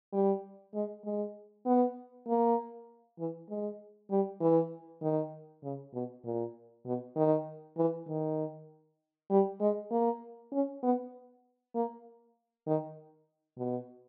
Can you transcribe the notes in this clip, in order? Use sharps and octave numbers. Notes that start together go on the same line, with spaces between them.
G3
G#3
G#3
B3
A#3
E3
G#3
G3
E3
D#3
C#3
B2
A#2
B2
D#3
E3
D#3
G3
G#3
A#3
C#4
B3
A#3
D#3
B2